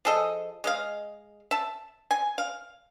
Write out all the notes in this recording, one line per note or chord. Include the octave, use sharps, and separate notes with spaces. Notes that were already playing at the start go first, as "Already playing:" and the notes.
F3 G#4 A4 D#5
G#3 D#5 F5
E5 A5
G#5
F5